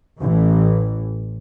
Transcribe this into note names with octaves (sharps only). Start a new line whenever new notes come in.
A1 E3